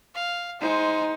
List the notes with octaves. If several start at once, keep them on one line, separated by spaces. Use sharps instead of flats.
F5
G#3 D#4 C5